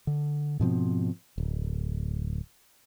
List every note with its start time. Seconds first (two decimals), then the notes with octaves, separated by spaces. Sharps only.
0.07 D3
0.60 G#2 B2 F3 C4
1.38 D1